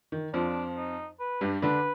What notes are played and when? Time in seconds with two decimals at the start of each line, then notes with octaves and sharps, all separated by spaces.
0.12 D#3
0.33 F2 F3 D4
0.76 D#4
1.19 B4
1.41 G2 G3
1.62 D3 D4 B4